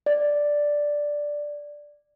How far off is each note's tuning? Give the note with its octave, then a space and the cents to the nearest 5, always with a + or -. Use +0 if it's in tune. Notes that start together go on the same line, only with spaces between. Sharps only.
D5 +0